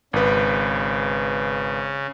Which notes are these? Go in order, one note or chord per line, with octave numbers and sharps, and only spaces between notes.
G#1 C#3 B4